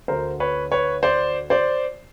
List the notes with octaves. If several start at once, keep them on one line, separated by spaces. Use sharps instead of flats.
D2 D3 A#4 C5
B4 C#5
B4 C#5
C5 D5
C5 D5